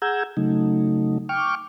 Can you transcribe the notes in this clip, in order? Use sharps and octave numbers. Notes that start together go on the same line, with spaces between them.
G#4 F#5 A#5 E6 G6 G#6
C#3 F#3 A3 D#4
G5 C#6 D6 F6